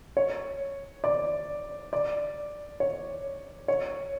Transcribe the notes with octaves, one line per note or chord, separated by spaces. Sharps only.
C#5
D5
D5
C#5
C#5